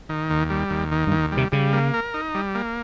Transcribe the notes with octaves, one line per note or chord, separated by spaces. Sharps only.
D#3
D#2
G3
D#2
D#3
G2
D#2
G3
C3
C#3 G3
A#3
A#4
D#4
G3
A#3